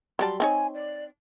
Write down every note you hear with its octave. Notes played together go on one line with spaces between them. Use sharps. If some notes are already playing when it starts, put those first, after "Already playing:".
F#3 G3 A5 C6
C4 D#4 C#5 G#5
D5